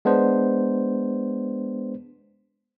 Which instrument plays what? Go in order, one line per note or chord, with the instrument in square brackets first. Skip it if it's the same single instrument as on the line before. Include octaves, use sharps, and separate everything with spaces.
[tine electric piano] G#3 B3 D4 C5